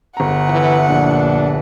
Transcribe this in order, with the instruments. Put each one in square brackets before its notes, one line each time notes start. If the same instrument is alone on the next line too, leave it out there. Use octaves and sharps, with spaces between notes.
[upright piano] G1 A#5 [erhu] F#5
[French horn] E3
[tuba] A#1 [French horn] D4